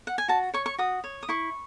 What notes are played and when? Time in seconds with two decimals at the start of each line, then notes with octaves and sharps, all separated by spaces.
0.07 F#5
0.18 G#5
0.28 F#4 A5
0.54 C#5 C#6
0.66 C#6
0.78 F#4 D#6
1.04 C#5
1.23 D#6
1.29 E4 C#6